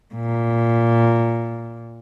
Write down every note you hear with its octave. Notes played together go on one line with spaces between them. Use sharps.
A#2